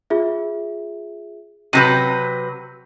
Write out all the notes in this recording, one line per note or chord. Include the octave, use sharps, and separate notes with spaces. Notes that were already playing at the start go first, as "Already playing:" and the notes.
F4 G#4 E5
C3 F#3 B4 G6 A#6 D#7